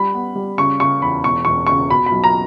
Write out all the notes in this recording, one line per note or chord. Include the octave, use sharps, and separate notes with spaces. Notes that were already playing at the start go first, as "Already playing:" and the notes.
Already playing: G3 B5
B3
G3
C#3 C#6
C#3 C#6
E2 B5
E1 C#6
E1 C#6
C#3 C#6
B2 B5
B5
B1
A#5